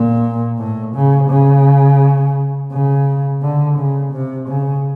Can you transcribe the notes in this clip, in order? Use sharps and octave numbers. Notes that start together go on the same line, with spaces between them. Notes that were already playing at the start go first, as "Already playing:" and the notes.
Already playing: A#2
A2
C#3
C#3
C#3
D3
C#3
C3
C#3